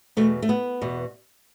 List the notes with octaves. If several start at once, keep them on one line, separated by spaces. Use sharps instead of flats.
E2 B2 A3
A3
B3
E2 B2